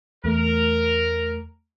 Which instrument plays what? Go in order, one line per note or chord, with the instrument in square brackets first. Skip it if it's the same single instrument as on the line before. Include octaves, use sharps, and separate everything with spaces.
[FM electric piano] E2 A3 [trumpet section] A#4